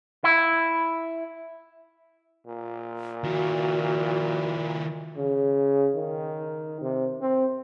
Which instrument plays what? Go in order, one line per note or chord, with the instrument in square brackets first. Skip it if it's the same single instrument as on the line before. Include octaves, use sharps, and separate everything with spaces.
[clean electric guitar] E4
[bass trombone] A#2
[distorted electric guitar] D#3 E4 [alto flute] F#4
[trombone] C#3
D#3
C3
C4